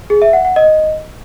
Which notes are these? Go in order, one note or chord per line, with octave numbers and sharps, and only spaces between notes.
G#4
E5
F#5
F#5
D#5